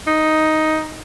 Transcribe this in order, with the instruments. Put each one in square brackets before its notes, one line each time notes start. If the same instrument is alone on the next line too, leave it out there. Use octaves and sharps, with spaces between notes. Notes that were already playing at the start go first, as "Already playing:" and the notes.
[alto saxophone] D#4